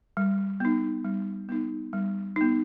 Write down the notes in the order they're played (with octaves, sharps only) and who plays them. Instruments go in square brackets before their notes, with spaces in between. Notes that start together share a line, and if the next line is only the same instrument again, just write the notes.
[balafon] G3
B3 D#4
G3
B3 D#4
G3
B3 D#4